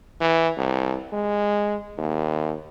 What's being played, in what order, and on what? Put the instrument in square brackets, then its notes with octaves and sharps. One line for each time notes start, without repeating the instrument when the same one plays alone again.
[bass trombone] E3
C2
G#3
D#2